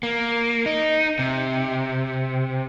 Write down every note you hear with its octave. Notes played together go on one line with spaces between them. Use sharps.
A#3
D#4
C3